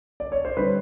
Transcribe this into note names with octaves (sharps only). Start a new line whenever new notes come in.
D5
C#5
C5
D3 G3 B4